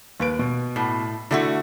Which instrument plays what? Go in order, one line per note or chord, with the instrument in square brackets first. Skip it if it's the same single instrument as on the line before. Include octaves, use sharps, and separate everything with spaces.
[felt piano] D#2 B4 D7
B2
[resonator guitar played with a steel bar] A2
[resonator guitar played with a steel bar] D3 A3 F#4 [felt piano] E4